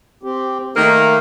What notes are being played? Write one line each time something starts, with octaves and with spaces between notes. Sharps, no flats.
C4 G4
D#3 A3 A#3 D#4